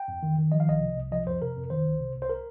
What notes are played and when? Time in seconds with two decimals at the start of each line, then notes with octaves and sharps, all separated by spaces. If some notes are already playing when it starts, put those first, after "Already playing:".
Already playing: G5
0.08 F2
0.23 D#3
0.38 D#3
0.52 F3 D#5
0.60 F5
0.67 C2 D#5
0.81 C3
0.96 C2
1.12 F3 D#5
1.26 F2 C5
1.42 C3 A#4
1.56 F2
1.70 D#3 C5
1.85 C2
2.00 C3
2.15 C2
2.22 C5
2.29 A#4